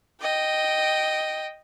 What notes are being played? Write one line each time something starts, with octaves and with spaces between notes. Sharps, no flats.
D#5 G5